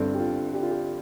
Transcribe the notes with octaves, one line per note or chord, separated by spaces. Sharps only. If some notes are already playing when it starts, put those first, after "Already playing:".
Already playing: G1 G2 D3 C4
G4
F4
G4
F4
G4